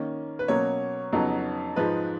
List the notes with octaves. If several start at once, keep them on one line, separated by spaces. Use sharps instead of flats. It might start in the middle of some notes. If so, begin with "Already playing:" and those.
Already playing: D#3 A#3 C#4
B4
B2 F#3 A#3 C#4 C#5
F2 C#3 F#3 B3 D#4
G#2 F3 G#3 D#4 B4